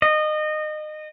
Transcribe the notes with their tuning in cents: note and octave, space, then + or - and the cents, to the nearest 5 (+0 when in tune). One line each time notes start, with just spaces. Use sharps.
D#5 -25